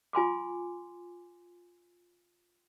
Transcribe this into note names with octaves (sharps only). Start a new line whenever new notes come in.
F4 G#5 C6 D6